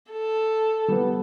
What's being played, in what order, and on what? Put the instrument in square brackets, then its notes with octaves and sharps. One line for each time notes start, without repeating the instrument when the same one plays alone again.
[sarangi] A4
[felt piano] G3 B3